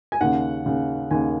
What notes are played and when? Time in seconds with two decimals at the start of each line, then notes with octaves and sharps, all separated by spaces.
0.12 G#5
0.21 D#2 C#3 F#5
0.66 D#2 C#3
1.11 D#2 C#3 G#5